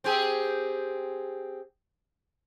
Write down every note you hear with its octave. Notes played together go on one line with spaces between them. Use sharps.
C4 G4 G#4